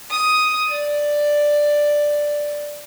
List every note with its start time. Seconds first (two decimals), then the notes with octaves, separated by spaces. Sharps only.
0.10 D#6
0.68 D5